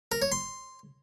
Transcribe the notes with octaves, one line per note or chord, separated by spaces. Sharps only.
A#4
C#5
C6